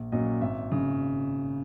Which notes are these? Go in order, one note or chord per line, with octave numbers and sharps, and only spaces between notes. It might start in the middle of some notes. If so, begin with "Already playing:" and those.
Already playing: A#1
A#2 F#3 C#4 D#5
G#1 E5
C#3